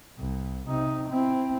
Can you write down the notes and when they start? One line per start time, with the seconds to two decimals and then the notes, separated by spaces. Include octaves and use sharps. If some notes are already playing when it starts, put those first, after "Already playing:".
0.18 C2
0.68 C3 D#4
1.09 C4 E4